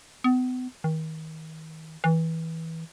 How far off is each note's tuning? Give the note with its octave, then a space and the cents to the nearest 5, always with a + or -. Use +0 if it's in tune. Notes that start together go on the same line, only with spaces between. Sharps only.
B3 +40
D#3 +35
E3 -20